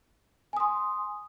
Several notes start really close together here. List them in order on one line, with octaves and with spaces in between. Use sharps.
G#5 D#6 C6